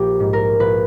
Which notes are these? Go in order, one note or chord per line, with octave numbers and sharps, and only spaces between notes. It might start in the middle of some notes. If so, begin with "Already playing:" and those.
Already playing: A#1 G4
G#2
A#4
A#1 B4